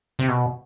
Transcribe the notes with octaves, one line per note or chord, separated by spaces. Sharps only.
C3
B2